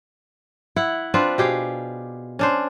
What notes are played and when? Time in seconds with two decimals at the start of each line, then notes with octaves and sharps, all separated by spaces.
0.76 E4 F#5
1.14 C4 D4 F4 B4
1.38 B2 G4 G#4 F5
2.39 C#4 D4 C5